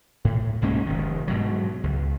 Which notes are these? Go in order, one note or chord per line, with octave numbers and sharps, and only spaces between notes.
A2
C2 G#2 A#3 C#4
F1 D#3
G#2 B2 F#3
C#2